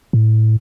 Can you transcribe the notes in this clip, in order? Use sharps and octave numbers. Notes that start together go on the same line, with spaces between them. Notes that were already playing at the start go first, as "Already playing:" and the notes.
A2